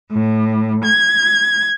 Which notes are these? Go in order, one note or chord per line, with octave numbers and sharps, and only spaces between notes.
A2
G#6